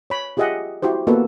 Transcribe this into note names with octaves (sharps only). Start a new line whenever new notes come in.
C#5 B5
F4 G4 G#4 D#5 E5 F#5
E4 F#4 G4 C5
A#3 B3 F#4 A4 B4